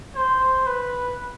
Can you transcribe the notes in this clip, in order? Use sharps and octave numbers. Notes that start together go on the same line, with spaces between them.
C5
B4